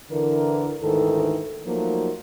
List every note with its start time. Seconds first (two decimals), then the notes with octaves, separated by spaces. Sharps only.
0.11 D3 E3 A#4
0.81 D2 G#2 D#3 E3 A4
1.67 F3 F#3 A3 A#3 D#4